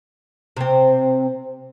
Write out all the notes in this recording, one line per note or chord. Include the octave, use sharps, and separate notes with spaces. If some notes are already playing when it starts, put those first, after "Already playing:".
C3 C4